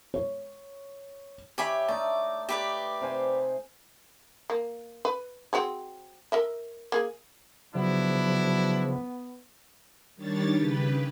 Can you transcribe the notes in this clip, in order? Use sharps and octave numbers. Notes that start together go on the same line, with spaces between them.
C#5
G4 C#5 D5 E5 G#5 B5
A3 D#4 D5
G4 B4 D5
C3 C5 G#5
A#3
B4
C4 F#4 G#4
A#4 D#5 E5
A#3 G#4
C#3 F3 F#3 B3 D4 E4
D#3 G3 D4 C#5 A6
C#3 G4 B4